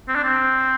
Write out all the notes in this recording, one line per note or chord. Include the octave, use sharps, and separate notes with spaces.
C4
D4
C4